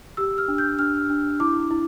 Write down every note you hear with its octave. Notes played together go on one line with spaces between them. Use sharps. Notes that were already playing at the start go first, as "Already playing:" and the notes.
G4 E6
F6
D4
G6
D4 F6
D4
E4 D6
E4